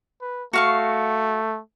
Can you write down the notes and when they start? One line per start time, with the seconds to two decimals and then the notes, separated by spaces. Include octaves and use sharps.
0.21 B4
0.53 A3 F#4 F5 C#6